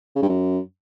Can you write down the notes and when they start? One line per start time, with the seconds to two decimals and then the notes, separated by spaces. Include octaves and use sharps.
0.16 C#3
0.22 G2
0.29 F#2